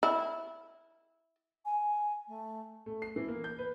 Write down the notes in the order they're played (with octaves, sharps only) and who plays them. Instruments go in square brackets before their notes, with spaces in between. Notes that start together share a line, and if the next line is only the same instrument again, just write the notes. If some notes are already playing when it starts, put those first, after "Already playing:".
[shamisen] E4
[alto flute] G#5
A3
[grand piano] A3
C7
E3
A#3
G6
B4